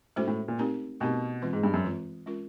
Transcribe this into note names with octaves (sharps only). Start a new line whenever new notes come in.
A2 G#3 C#4 F#4 A4 C5
A2
A#2
A3 C4 D#4 G4 A#4
B2 A3 C4 D#4 G4 A#4
E3 G#3 C4 F4
G#2
G2
F#2
E3 G#3 C4 F4
G#3 C#4 F4 A#4